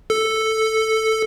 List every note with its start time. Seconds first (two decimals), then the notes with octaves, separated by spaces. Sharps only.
0.10 A4